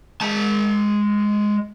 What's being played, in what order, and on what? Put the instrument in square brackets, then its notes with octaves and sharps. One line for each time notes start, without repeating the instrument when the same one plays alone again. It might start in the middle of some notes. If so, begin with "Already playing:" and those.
[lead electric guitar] G#3 A5